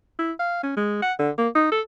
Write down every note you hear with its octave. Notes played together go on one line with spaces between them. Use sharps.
E4
F5
C#4
G#3
F#5
D3
A#3
D#4
A4